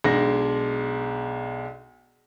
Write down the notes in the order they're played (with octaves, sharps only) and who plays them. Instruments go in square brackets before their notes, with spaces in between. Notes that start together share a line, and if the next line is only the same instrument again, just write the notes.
[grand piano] B1 G#3 D4 A#6